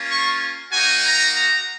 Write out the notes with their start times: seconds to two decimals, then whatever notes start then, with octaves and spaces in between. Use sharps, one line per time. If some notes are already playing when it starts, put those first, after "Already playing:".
Already playing: A#3 C#4 F4
0.10 C#6
0.72 A#3 D#4 F#4 G#5
1.04 A#5
1.35 A#5